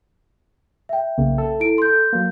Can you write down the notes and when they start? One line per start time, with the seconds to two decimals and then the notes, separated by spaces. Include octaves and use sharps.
0.89 E5 G5
1.18 B1 C#3 A#3
1.38 A4
1.60 E4 D7
1.78 C6 G6
2.13 F#3 A#3